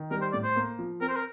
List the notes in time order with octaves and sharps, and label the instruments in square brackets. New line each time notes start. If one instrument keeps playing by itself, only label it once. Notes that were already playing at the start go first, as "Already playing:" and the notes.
Already playing: [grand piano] D#3
[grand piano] G3 [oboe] A#4
[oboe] C5
[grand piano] A2 [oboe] D5
[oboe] C5
[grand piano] A#3
F3
[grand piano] C4 [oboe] A#4
[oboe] C5
A#4